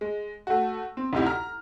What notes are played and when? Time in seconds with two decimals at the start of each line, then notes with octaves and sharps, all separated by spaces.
0.01 G#3
0.47 A3 F#4
0.97 C4
1.13 D2 C3 D#4 E4 G4
1.26 A#5 F6